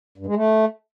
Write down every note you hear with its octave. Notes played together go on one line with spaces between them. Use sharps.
G2
G#3
A3